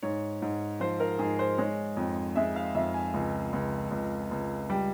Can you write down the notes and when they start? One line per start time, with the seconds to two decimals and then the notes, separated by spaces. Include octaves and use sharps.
0.03 G#2 C#5
0.42 G#2
0.80 F3 C5
1.00 A#4
1.19 G#2 G#4
1.39 C5
1.58 G#3 C#5
1.97 F2
2.36 G#3 E5
2.56 F5
2.75 F2 E5
2.94 G#5
3.14 C#2
3.53 C#2
3.91 C#2
4.31 C#2
4.70 G3 G5